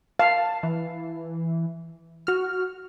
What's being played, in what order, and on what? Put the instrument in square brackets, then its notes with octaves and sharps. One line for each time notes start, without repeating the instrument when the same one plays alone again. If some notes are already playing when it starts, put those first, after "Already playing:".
[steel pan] F5 [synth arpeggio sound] A5
[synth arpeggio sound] E3
F#4 F6